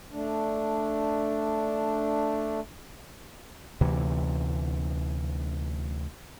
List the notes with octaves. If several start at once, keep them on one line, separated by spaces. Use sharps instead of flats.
A3 D4
D2 C3 E3